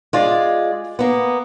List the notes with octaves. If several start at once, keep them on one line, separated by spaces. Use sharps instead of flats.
G#3 F4 D5
A#3 B3